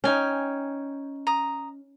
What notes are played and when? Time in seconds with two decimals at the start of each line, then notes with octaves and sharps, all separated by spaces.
0.04 C#4 D#4 G5 G#5
1.27 A#5 D#6